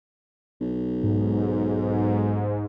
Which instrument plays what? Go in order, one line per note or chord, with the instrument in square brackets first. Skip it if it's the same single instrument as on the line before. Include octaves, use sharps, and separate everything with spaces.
[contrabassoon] B1
[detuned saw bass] G#2